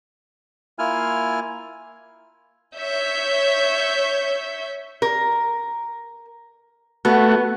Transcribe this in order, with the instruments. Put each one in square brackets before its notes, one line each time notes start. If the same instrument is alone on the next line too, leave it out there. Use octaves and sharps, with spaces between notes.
[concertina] A#3 E4 F4 G#5 F6
[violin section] C#5 E5 G6
[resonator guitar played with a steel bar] A#4
[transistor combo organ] A3 F#4 [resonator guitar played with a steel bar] B3